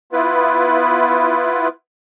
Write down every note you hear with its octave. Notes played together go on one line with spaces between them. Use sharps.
B3 E4 F4 B4